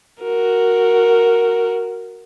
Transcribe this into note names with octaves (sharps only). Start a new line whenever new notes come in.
F#4 A#4